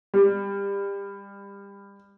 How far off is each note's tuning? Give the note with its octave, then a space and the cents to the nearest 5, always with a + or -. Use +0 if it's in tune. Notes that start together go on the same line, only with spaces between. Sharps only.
G3 +25